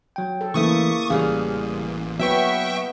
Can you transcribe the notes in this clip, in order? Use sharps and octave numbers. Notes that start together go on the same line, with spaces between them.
F#3 G5
A4
C#3 E3 A3 A#3 E4 C#6 D#6
A1 C#3 G3 G#4 F5
F#3 B3 B4 E5 G5 C#6